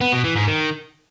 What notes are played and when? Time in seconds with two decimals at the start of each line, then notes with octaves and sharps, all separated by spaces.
0.01 B3
0.12 B2
0.24 E3
0.35 G#2
0.47 D#3